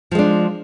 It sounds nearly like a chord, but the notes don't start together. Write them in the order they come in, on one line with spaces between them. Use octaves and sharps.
F3 G#3 D4